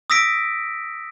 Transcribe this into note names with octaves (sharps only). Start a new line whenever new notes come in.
D#6 E6 A#6 B6 D7